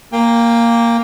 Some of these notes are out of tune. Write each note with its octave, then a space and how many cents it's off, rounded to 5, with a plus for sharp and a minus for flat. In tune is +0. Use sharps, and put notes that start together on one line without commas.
A#3 +0 G5 +25